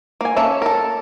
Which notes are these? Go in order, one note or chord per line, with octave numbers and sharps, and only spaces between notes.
A#3 G#5
A#3 C#4 A4 E5
A4 A#4